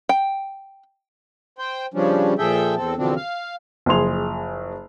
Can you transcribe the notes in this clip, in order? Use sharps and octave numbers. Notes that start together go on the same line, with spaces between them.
G5
C5 G5
C#3 F3 G3 C#4 D4
A#2 F3 G#4 A4 E5 G5
E2 C4 A4
E2 B2 D3 F3 C4 D4
F5
F#1 F3 G#4 C6 F7